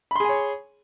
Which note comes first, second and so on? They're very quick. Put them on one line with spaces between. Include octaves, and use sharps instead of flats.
B5 C6 G#4 G#5 C#5